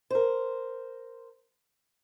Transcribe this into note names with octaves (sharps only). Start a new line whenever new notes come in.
A#4 C5